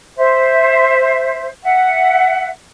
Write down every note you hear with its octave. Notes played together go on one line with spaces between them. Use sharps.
C5 E5
E5 F#5